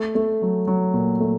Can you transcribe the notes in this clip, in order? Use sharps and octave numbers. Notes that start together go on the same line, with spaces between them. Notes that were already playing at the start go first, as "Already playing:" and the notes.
Already playing: A3
A3
F#3
F#3
A#2
A3